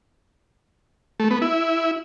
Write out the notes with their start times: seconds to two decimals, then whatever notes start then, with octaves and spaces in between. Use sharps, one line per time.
1.20 A3
1.31 B3
1.42 E4